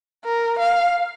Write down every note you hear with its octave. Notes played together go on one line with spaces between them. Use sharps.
A#4
F5